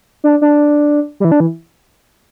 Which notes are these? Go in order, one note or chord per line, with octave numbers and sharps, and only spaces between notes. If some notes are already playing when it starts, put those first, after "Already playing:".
D4
D4
G3
E3
D4
E3